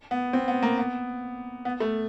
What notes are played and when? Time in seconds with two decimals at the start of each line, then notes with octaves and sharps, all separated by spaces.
0.11 B3
0.33 C4
0.48 B3
0.63 A#3
0.77 B3
1.65 B3
1.80 A3